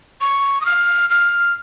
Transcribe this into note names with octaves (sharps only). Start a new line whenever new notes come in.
C#6
D#6
F6
F6